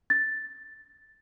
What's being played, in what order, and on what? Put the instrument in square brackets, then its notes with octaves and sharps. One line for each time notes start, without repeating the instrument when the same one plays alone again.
[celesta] A6